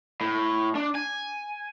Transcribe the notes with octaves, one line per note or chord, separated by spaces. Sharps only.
A2
D4
G#5